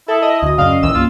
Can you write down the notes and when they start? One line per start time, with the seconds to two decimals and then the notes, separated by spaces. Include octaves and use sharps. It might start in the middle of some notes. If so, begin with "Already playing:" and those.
0.08 E4 A4 E5 A5 D#6
0.22 D#5
0.43 D2 F#4 D#6
0.58 F#2 C#3 C#4 D5 D#5 F5
0.83 A#1 D#2 E3 E6
0.94 C2 G2 A#3 F4